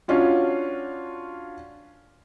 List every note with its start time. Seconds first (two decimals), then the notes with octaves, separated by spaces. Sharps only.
0.08 C#4 D4 F4 F#4